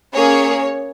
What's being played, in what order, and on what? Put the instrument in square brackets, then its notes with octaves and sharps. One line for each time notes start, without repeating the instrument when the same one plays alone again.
[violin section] A#3 C#4 G#4 C#5